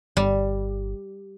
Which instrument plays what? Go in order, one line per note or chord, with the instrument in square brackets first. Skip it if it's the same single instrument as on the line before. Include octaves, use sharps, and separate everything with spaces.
[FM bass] G1 [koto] G3